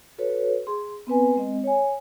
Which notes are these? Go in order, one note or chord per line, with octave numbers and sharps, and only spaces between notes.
F#4 A4 B4 C#5
G#4 C6
B3 C4 B4 G#5
G#3 C4 D#5
C#5 G#5